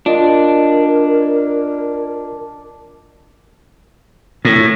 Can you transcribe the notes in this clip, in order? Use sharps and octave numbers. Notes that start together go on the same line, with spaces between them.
D4 F4 A#4 D#5
A2